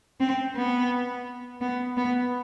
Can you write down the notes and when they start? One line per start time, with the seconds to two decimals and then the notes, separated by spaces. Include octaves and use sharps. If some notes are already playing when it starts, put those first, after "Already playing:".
0.20 C4
0.56 B3
1.61 B3
1.97 B3